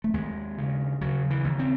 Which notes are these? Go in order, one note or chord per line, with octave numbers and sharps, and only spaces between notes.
A3
D#2 G#3
C#3
C#3 F#3
E3
D#2
C4